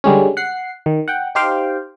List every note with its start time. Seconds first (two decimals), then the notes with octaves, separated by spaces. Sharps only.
0.04 D3 G3 G#3 C#4
0.37 F#5 C7
0.86 D#3
1.08 F#5 G5
1.35 D#4 G4 C5 F5 G5